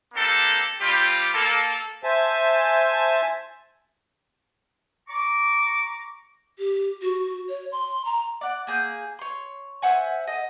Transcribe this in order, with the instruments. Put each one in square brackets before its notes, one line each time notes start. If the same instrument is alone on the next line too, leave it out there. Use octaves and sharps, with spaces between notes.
[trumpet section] A#3 C4 D4 G4 A4
G3 C4 F4 G4
A#3 A4
[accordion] C5 E5 G#5 A5
[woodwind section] A#5 C#6 D6
[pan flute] G4
F#4
C#5
C6
A#5
[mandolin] D5 F#5
A#3 G#4 G6
C#5 C6
C5 E5 F#5 G#5
A4 D#5